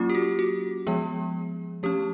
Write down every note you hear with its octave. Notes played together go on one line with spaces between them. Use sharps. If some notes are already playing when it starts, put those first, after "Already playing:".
Already playing: F#3 A#3 C#4 F4
G4
F#4
F#4
F3 G#3 B3 G#4
F3 A3 C#4 G4